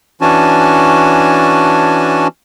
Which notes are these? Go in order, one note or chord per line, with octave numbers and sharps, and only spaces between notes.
E3 C#4 D4 F#4 G#5 A5